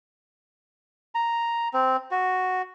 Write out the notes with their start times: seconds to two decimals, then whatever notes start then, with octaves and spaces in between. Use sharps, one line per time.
1.15 A#5
1.74 C4
2.11 F#4